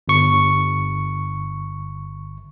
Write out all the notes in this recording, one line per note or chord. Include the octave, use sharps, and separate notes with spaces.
G1 C#6